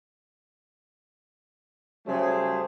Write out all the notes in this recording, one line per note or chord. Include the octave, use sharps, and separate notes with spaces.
C#3 F#3 G3 A3 G#4 C5